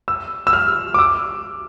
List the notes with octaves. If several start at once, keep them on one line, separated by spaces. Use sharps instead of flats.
E6
E6
F6
D6
E6